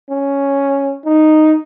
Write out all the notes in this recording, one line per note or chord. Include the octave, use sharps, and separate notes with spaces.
C#4
D#4